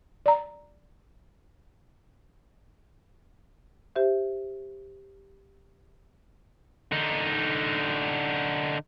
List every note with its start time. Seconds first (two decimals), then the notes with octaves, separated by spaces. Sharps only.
0.26 D5 A#5
3.96 G4 C5 E5
6.92 D3 D#4